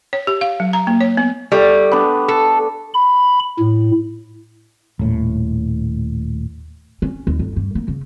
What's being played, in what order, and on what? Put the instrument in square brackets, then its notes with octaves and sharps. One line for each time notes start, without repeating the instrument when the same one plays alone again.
[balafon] C#5
G4
F5
F#3
A#5
A#3
C#5
B3
[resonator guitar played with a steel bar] G3 [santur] A3
[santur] B3 D4
[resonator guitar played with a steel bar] A4
[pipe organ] B5
A2
[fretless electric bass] D#1 A2
[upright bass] C#4
D#2
G1
G2
A#3
C#3